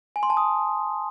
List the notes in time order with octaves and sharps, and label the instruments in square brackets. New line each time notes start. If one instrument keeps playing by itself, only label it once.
[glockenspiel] G#5
C6
A5
D#6